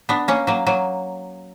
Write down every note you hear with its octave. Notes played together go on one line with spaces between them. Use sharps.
B3 D4
A#3 C#4
F#3 A#3
F#3 A#3